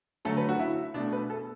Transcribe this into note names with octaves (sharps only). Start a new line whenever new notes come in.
D3 F#3 A3 A4
B4
F#4
E4
B2 A3 D4
B4
A4